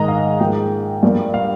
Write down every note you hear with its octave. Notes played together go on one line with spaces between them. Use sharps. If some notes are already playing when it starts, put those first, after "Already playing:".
Already playing: G#2 D#3 G#3 D#5 A#5
F5
G#2 F3 A#3 G5
G2 F3 A#3
F5